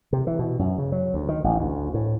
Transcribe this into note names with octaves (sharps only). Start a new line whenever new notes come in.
C3
E3
B2
F#2
C#3
F#3
D2
D#3
A1
D2
A2